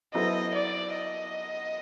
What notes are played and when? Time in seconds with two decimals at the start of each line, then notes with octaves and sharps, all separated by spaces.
0.14 F#3 B3 E4 A4 C5 D#5
0.55 D5
0.96 D#5